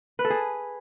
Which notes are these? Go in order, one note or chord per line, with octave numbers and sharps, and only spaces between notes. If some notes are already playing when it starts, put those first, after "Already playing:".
B4
A4
G#4